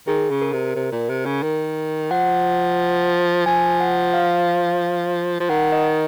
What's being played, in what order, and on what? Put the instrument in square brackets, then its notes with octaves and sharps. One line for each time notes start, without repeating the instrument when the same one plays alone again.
[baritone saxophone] D#3 [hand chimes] G#4
[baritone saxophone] C#3
[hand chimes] A#4
[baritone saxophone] C3
C3
A#2
C3
C#3
D#3
[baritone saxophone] F3 [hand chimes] F#5
[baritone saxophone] F3 [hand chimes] G#5
[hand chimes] F#5
F5
[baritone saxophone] F3
[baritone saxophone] D#3 [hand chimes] F#5
[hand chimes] D#5